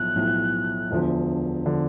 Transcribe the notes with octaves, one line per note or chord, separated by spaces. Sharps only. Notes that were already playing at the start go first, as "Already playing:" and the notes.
Already playing: B1 A2 F3 F#6
B1 A2 F3
E1 D2 D3 F3
D3 F3